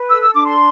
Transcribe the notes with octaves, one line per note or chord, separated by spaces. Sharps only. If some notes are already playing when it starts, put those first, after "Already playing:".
Already playing: B4
A4 E6
E6
D4 D6
C6